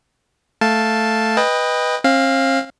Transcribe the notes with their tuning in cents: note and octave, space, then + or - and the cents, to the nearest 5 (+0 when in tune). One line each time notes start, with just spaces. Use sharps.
A3 +0 F5 +0 A5 +0
B4 +0 D#5 +0 G5 +25
C4 +45 F5 +0